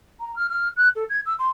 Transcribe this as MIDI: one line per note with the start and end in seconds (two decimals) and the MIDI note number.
0.20 0.34 82
0.36 0.47 89
0.49 0.68 89
0.76 0.88 90
0.95 1.04 69
1.09 1.20 92
1.25 1.34 88
1.38 1.48 84